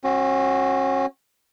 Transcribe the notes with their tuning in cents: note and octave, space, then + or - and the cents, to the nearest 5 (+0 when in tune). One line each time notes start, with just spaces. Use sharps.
C#4 -40 F#4 +0